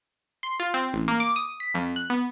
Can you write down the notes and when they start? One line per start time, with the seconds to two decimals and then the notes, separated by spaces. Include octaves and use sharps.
0.43 C6
0.60 F4
0.74 C4
0.94 A1
1.08 A#3
1.20 D6
1.36 D#6
1.60 B6
1.74 F2
1.96 F#6
2.10 B3